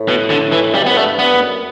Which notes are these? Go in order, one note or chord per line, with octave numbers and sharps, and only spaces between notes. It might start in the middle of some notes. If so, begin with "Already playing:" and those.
Already playing: A2
B2
D3
E3
C#3 G3
B2
A2 B3
G2 A3
B3
E2
F#2